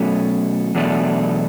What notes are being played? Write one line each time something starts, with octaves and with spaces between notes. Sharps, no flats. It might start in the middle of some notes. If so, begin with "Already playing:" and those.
Already playing: B2 F#3 A3 C#4
E2 B2 F#3 A3 D4